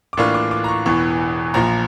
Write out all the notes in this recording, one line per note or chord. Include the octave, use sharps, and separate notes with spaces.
D6
A2 E3 A#3 D4 F4 C#6
D6
D6
A#5
C#6
E1 E2 E3 C#6
A#1 A#2 F3 A#5